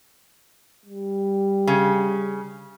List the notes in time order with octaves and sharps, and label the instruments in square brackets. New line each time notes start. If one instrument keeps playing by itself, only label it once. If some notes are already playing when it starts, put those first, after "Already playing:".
[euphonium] G3
[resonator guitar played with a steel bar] C#3